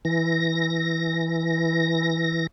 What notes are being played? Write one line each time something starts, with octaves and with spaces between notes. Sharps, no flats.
E3 A#6